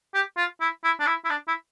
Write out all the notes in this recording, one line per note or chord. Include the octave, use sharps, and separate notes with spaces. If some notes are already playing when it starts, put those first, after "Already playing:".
G4
F4
E4
E4
D4
E4
E4
D4
E4